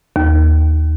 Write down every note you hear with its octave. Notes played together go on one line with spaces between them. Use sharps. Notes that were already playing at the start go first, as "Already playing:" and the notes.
D#2